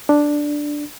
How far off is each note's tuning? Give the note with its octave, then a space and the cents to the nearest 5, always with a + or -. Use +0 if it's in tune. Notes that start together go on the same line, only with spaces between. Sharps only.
D4 +0